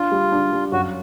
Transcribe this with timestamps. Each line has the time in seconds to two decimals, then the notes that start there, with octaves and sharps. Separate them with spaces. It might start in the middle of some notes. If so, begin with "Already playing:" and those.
Already playing: D4 F4
0.12 G3
0.32 D4
0.53 G3
0.72 F#2 F#4